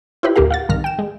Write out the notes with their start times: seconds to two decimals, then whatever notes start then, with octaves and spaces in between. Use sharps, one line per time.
0.23 E4 F4 G4 B4 C5 B5
0.36 D2 A2 A#3 G4 A#4 F5
0.51 F5 F#5 A6
0.69 C2 G#2 D#3 F6 A#6
0.84 G5 E7
0.99 G#3